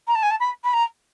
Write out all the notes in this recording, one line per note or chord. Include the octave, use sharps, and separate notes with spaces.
A#5
A5
G#5
A5
B5
B5
A#5